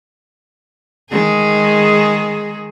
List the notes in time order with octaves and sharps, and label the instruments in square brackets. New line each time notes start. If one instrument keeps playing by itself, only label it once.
[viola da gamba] D#3 G#3 G#4